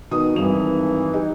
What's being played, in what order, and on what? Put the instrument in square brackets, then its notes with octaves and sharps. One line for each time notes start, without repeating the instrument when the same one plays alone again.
[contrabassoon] B2 [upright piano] D#3 [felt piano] D#6
[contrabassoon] G#1 [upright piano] G2 F7 [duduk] E3
[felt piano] D#4 G4